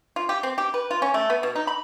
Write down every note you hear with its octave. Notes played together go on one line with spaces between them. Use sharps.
F4
G4
C4
G4
B4
F4
C#4
A3
B3
B2
D#4
B5